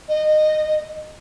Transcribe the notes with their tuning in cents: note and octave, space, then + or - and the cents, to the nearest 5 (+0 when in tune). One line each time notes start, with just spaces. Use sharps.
D#5 -20